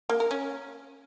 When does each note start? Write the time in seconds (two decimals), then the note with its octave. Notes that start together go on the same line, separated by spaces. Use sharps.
0.10 A#3
0.20 A#4
0.31 C#4